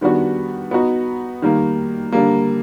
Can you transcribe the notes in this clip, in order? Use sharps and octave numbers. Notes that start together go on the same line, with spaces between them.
D#3 G3 B3 D4 F#4
B3 D#4 F#4
D#3 G3 A#3
D3 G3 A#3